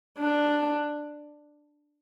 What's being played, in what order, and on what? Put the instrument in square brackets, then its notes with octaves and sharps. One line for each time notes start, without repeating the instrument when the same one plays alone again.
[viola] D4